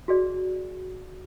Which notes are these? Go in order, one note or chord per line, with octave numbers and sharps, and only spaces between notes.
F#4 G#4 D5